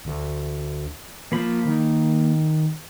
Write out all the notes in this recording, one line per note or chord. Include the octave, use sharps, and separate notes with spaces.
D2
F3 A#3 B5
D#3